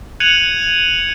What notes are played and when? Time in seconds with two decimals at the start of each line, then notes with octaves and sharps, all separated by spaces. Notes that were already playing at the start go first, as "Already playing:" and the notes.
0.20 F#6 G#6 C#7 D#7 F7 F#7